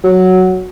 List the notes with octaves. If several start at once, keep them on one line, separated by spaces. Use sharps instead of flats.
F#3